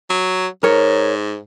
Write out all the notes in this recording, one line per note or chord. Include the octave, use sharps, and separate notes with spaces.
F#3
G#2 A#4 C#5